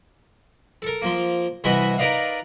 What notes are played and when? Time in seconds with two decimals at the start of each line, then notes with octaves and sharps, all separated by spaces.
0.82 A4 A#4
1.02 F3 A#3
1.64 C2 E3 E4 F#4 B4 D#5
1.98 D#4 A#4 B4 D5 D#5 F5